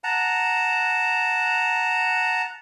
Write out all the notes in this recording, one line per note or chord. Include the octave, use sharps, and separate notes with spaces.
F#5 A5 A#5